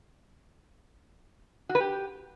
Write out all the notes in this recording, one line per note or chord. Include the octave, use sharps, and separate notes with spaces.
F#4
B4
G4